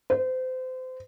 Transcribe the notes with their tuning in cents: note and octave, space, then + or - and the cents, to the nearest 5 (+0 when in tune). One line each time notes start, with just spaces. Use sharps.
C5 -30